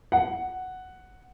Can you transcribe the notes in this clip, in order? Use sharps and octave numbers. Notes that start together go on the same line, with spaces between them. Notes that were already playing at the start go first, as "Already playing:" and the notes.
F#5